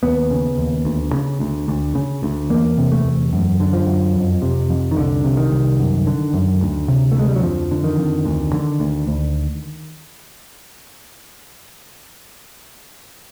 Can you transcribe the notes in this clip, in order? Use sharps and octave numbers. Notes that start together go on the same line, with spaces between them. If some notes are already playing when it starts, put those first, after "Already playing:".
D#2 B3
C#3
D#2
D2
C#3
D2
D2
C#3
D2
E2 A#3
C3
A3
E2
F#2
D3
F3
F#2
F2
C3
F2
D#3
C2 D3
C3
D#3
C2
F#2
D3
F#2
D2
C3
A3
D2 G#3
G3
F#3
F2 F3
D3
D#3
F2
D2
D3
D2
D2